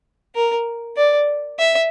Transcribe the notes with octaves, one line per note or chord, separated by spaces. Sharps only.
A#4
D5
E5